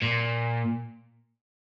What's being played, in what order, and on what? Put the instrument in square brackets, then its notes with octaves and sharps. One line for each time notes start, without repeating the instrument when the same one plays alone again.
[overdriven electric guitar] A#2